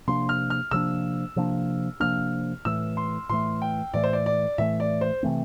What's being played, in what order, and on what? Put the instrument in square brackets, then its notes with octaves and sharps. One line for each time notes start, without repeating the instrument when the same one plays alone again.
[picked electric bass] C3 F3 A#3 D4 [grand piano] C6
[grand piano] F6
F6
[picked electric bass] C3 F3 A#3 D4 [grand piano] E6
[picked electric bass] C3 F3 A#3 D4
[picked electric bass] C3 F3 A#3 D4 [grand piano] F6
[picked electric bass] A2 E3 A3 [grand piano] E6
[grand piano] C6
[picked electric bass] A2 E3 A3 [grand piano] C6
[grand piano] G5
[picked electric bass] A2 E3 A3 [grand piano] D5
[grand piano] C5
D5
D5
[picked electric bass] A2 E3 A3 [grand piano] E5
[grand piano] D5
C5
[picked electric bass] C3 E3 A3 C4